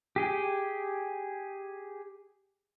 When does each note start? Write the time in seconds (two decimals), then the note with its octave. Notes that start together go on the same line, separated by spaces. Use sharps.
0.16 G4 G#4 G5